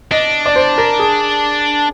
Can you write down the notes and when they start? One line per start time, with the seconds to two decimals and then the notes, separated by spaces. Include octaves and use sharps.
0.11 D4 D#5
0.46 D5
0.56 C5
0.78 A#4
0.99 G#4